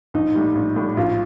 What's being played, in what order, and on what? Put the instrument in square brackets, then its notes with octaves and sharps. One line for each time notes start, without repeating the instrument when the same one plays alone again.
[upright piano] A#1 [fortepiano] D#4
[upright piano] A2 G3
A#1
A2 G3
[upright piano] A#1 [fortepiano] F4